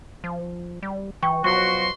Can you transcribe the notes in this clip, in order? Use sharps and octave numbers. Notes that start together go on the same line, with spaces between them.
F3
G3
E3 G5 C#6
B2 F3 F#3 F#4 C6 C#6